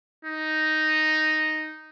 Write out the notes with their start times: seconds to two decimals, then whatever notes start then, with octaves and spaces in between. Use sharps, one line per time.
0.25 D#4